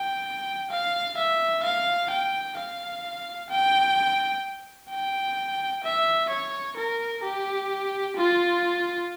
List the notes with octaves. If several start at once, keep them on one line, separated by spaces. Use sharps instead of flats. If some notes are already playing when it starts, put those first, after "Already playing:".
Already playing: G5
F5
E5
F5
G5
F5
G5
G5
E5
C#5
A#4
G4
F4